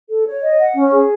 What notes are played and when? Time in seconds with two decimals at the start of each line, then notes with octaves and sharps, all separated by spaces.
0.10 A4
0.27 C#5
0.42 D#5
0.59 F#5
0.75 C#4
0.92 G#4